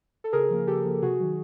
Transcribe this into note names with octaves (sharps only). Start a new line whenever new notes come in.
A4
C#3 G#4 A#4
F3 A#3
C#3 G4 A4
F3 A#3
C3 F#4 G#4
D#3 F#3